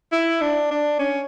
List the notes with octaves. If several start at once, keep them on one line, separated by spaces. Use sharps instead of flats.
E4
D4
D4
C#4